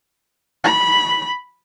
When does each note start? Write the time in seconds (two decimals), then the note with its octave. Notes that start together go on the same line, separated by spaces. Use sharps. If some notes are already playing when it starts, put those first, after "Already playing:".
0.64 B5